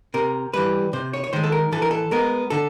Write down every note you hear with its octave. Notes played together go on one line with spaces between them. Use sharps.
C3 A#4
E3 G3 B4
C3 C5
C#5
C#5
D#3 G#3 C5
A4
A#4
E3 A4
A#4
A4
G#3 B3 A#4
D3 A4